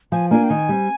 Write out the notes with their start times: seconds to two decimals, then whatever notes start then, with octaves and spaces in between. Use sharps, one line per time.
0.12 F3 G#5
0.30 A#3 D4 F4 A#4 G#5
0.44 G5
0.49 D#3 G#5
0.69 G3 C4